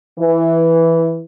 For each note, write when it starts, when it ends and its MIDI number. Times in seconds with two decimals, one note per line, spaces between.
0.19 1.22 52